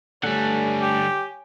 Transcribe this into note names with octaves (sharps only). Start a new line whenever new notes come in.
D3 G3 A3 D4 C#5 F#5 G#5
G4